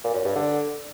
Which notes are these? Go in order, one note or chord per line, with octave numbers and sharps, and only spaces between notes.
A#2
F#2
G2
D3